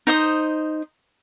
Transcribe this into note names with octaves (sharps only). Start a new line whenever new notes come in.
D#4 C5 D#6